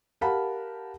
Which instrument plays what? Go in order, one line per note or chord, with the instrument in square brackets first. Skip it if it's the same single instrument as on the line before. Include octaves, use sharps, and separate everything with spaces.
[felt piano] G4 A#4 F5 F#5 A5 B5